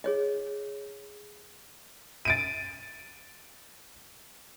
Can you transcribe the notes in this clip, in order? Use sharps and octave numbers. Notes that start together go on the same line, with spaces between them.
G#4 C#5 D#5
A6 D7 D#7